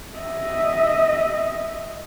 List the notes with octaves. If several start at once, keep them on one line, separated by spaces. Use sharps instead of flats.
D#5 E5